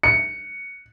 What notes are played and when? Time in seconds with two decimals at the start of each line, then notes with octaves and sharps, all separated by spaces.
0.03 C#7